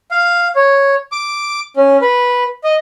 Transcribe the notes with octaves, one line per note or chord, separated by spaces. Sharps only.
F5
C#5
D6
C#4
B4
D#5